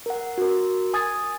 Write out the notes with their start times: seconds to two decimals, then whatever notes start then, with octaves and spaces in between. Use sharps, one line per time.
0.06 A#4 F#5
0.38 F#4 A#4
0.94 G#5 D#6 G#6 A6